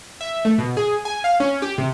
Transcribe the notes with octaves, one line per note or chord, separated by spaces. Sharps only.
E5
A3
B2
G#4
G#5
F5
C#4
G4
C3